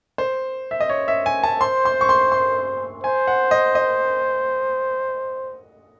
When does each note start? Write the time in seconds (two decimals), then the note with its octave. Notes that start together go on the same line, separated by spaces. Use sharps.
0.18 C5
0.71 E5
0.80 D#5
0.89 C#5
1.08 E5
1.26 G#5
1.43 A5
1.61 C5 C6
1.85 C6
2.01 C#6
2.09 C6
2.32 C6
3.04 C5 G#5
3.28 F#5
3.51 D#5
3.75 D#5